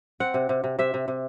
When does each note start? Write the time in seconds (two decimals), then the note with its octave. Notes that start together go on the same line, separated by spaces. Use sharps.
0.20 C4 F#5
0.34 C3
0.49 C3
0.64 C3
0.79 C3 E5
0.94 C3
1.08 C3